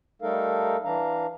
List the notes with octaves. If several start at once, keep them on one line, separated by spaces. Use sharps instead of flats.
G3 A3 D#4 A4 A#4 F5
E3 D4 F5 A#5